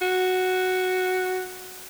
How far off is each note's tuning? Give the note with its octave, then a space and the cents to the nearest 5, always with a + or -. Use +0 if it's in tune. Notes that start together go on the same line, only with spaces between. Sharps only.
F#4 +0